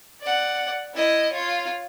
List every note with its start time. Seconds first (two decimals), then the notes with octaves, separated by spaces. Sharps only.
0.22 D5 F#5
0.94 E4 D#5
1.33 F4 C#5